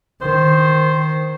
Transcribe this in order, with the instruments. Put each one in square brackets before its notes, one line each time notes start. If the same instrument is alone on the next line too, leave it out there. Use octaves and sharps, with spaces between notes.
[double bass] D#3 [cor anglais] C5